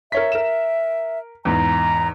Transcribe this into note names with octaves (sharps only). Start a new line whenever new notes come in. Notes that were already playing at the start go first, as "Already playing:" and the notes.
A#4 C#5 E5 B6
A#4 E7
E2 G#2 A#5